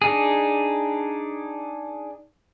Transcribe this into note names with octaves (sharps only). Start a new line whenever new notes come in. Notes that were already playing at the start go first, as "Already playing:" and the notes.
D4 D#4 G#4